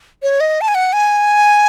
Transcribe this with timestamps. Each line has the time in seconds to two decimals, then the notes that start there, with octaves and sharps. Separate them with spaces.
0.23 C#5
0.40 D#5
0.61 A5
0.68 G#5
0.75 F#5
0.93 G#5